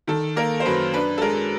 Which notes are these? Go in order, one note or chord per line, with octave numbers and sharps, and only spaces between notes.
D#3 A4
A#3 A#4
C5
F#2 B4
D4 B4
A4
G#3 A#4